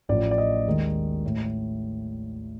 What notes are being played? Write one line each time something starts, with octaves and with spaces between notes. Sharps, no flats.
A1 A2 F3 D5
D5
D#5
D#2 D#3 G#3
A2